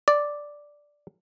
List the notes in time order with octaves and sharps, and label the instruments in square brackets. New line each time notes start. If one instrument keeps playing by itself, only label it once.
[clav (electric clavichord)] D5